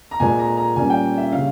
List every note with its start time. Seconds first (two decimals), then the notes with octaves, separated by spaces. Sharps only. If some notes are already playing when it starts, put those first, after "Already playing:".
0.11 A#5
0.20 A#2 G#3 C4 G#5
0.39 A#5
0.57 A#5
0.76 A#2 G3 A#3 C#4 G#5
0.90 G5
1.18 E5
1.32 C#3 G3 C#4 F5